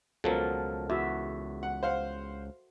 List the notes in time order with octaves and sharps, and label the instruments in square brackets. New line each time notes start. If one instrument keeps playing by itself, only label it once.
[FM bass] C#2 [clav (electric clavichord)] B2 F3 F#3 [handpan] A4 A#4
[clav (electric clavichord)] E2 [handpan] F#4 E5
[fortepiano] F#5
C5 F5 F#5